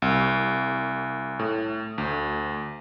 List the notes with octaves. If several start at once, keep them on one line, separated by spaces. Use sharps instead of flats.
C2
A2
D2